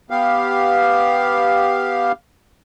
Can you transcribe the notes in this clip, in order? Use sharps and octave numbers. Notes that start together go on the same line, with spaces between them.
B3 G4 F5